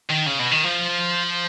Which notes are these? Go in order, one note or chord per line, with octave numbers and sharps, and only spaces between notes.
D#3
C#3
B2
D#3
F3